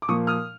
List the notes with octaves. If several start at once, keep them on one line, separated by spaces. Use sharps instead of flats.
D6
A#2 F3 A#3 C#6 D#6
D#6 F6